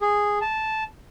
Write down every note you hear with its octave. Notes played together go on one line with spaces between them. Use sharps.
G#4
A5